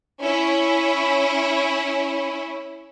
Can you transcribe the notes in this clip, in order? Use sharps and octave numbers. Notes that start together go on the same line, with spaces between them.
C#4 E4